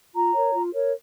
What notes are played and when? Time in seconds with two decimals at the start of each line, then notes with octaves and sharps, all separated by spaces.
0.14 F4 A#5
0.34 A#4 C#5
0.53 F4
0.72 A#4 C#5